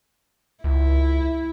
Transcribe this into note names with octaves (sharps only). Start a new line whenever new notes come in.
C#2 E4